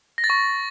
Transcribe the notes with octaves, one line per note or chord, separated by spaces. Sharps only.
A#6
A6
C#6